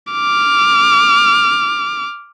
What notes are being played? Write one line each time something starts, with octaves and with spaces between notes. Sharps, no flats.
D6 F6